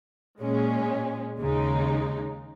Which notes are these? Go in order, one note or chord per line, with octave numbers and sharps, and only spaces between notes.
A#2 G#3 C#4
D#2 C#3 G#3 D#4